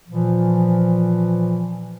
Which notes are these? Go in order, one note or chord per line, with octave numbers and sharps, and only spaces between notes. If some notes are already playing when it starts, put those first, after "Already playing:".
A#2 E3 F3